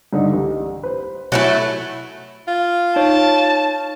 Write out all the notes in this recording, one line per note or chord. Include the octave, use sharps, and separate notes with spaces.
G2 D3 D#4
C2
B4 C5
F#3 A3 E4 G#5
F4
D#4 C#5 A5